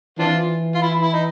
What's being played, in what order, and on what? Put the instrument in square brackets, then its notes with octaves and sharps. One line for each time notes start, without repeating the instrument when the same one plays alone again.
[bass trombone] E3 [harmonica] C4 D4 F4
[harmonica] F4
E4
E4
D#4